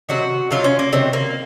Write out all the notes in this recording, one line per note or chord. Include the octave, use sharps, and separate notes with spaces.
C3 D#3 F#3 F#4
C3 D#3 F#3 F4
C#4
A#3
C3 D#3 F#3 C4
A#3